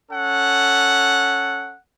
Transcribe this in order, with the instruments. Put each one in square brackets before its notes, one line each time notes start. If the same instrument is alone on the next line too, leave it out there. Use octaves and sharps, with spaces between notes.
[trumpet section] C#4 A4 F#5